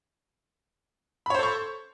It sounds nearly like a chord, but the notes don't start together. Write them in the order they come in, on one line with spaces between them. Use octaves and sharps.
B5 C#5 C5 A4 C#6